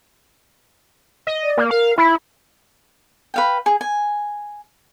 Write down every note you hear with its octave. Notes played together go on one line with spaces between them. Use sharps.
D#5
D5
A#3
A#4 F5
E4 B5
B4 F5 G5
G#4
G#5